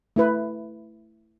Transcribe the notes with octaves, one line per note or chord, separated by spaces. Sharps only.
A3 E4 B4